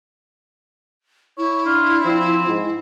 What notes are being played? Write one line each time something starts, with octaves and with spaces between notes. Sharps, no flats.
E4 C#5
D4 F4
F3 C4
G#2